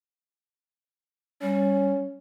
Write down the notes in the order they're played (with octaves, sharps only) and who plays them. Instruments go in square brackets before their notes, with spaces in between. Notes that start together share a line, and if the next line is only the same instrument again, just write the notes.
[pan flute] G3 [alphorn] C#4